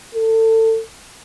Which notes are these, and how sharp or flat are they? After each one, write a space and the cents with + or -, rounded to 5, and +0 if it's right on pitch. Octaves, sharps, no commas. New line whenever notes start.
A4 +25